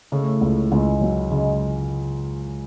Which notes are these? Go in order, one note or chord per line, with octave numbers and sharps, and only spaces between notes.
A2 C#3 A3
C#2
C#2 G#2 G#3
F#3
G#2 C#3 G#3